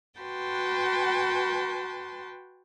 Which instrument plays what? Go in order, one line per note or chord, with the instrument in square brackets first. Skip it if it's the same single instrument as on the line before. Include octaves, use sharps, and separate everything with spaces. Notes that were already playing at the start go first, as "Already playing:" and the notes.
[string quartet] F#4 B4 G5 A5 C6